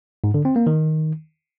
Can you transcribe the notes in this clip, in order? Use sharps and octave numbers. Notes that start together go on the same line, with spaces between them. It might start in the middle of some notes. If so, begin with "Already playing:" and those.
G#2
D3
C4
A#3
D#3